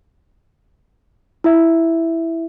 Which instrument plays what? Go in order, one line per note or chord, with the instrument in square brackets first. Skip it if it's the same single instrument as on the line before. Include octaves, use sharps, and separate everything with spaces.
[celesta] E4 E5